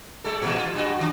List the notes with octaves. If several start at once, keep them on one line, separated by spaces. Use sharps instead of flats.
G3 G#3 A4
A2 C3 E3
F4
G2 G3 F#4
G2 D#3 D4